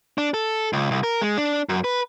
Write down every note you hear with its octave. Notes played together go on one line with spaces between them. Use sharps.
D4
A4
C#2
C2
A#4
G#3
D4
F#2
B4